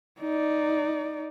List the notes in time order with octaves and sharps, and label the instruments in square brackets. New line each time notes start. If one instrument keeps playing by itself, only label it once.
[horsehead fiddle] D#4 D5